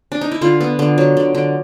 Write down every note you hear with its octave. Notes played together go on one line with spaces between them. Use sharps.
D4
D#4
E4
D3 F4
B3
D3
F#3
D3
D3